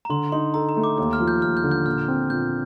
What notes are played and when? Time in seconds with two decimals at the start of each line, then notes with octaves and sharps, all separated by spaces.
0.05 A#5
0.10 D3 C6
0.32 D#4 C6
0.54 A4 A#5
0.69 A#5
0.77 A3
0.84 D6
0.98 D#2 D6
1.13 F6
1.20 F3
1.28 G6
1.42 D#2 F6
1.57 G6
1.64 D3
1.71 G6
1.86 A#2 F6
2.08 C4
2.30 A#2 G6